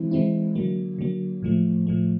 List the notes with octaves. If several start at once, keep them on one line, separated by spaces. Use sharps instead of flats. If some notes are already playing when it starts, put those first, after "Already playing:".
Already playing: E3 G#3 C4 E4
E3 G#3 C4 E4
D3 F#3 A#3
D3 F#3 A#3
A2 F3 A3
A2 F3 A3